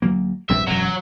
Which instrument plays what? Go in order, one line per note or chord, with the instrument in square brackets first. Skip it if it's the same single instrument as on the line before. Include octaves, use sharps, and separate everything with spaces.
[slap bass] D2 F#3 A#3
[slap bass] A#1 G2 C4 [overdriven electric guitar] E5
[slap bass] E1 F#2 [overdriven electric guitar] F#3